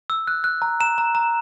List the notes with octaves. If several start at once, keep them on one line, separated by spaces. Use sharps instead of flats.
E6
F#6
F#6
A#5
A#5 E7
A#5
A#5